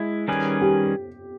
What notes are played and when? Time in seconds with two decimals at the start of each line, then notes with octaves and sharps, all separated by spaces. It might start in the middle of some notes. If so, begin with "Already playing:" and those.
Already playing: G#3 E4
0.28 D#3 G3 C#4 G#4 B4
0.61 G4